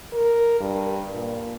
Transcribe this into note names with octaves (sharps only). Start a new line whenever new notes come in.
A#4
G2
A#2